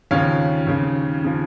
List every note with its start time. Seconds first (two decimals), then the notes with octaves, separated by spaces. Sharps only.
0.11 D#2 C#3 F3 C#5 F5
0.67 D#2 C#3 F3
1.24 C#3 F3